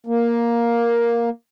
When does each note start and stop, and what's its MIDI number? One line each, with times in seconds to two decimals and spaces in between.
0.07 1.29 58